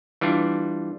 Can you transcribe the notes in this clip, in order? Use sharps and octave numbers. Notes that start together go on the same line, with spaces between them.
E3 G3 D4 F4